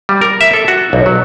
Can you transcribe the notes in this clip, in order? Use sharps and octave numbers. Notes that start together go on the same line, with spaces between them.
G3
A#4
E5
A4
F#4
B1
F#3